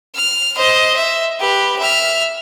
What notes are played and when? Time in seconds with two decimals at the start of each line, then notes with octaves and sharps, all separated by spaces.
0.15 F6
0.56 C5 D#5
0.96 E5
1.40 G4 B4
1.79 E5 F6